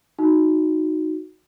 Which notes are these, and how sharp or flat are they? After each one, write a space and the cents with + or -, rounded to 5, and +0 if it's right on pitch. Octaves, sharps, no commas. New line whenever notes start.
D#4 +0 F#4 -10